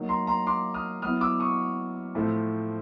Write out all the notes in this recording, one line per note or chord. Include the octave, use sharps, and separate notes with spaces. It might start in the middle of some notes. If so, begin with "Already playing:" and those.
Already playing: F#3 A#3 D#4
A#5 C6
A#5 C6
C6 D6
D#6 F6
F#3 B3 E4 D#6 F6
D6 E6
C#6 D#6
A2 F3 A3 C4